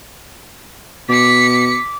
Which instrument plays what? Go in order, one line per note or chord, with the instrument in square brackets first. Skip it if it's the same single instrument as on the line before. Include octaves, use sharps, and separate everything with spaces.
[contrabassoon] B2 [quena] D6 [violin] B6 C#7